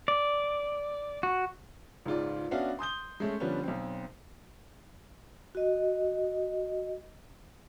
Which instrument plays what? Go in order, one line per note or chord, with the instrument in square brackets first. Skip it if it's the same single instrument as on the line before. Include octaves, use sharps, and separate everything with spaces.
[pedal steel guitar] D5
F#4
[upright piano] C#2 G#2 F4 D5
B3 C#4 D4 F#4 E5 F5
C6 D#6 G6 G7
G#3 A3 C#4
D3 F3 G3 B3 C#4
B1 C4
[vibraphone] F#4 D#5